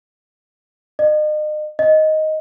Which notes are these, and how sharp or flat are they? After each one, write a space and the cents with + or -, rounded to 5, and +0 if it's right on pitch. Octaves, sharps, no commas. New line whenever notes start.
D#5 -40
D#5 +5